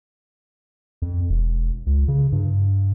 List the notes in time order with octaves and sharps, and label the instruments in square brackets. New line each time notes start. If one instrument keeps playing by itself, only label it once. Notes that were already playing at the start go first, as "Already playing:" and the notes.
[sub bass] F2
E1
C#2
C#3
G2